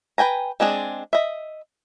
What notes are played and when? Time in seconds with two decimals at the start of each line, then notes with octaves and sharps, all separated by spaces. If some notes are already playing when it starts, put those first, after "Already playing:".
0.18 B4 G5 G#5 A#5
0.60 G#3 C4 D4 G#4
1.13 D#5 E5